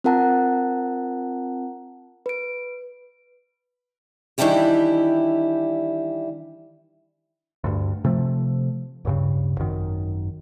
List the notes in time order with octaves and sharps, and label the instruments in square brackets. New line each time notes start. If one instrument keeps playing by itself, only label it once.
[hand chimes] C4 F4 A#4 F#5 A5 A#5
B4 D7
[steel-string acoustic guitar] D#3 E3 G3 D4 E4 G4
[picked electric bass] D2 G2
C3 F3 A3
D1 G2 C#3
G#1 F#2 D#3